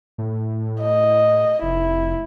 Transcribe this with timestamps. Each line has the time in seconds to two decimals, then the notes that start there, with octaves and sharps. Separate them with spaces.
0.18 A2
0.81 D#5
1.62 F1 E4